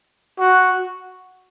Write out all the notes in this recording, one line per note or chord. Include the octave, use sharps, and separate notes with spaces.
F#4